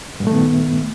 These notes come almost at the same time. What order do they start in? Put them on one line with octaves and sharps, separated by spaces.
G2 A#2 A3 D#3 B3